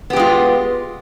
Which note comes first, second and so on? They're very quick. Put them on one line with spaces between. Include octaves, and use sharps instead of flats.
B3 G4 G#3 F4